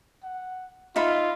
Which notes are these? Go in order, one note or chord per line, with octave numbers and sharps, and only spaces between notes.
F#5
D#4 F4 E5 B5